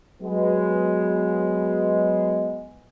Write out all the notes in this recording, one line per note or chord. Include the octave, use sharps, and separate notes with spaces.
F#3 G#3 B3